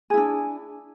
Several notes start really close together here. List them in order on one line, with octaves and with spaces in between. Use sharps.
G#4 E4 D4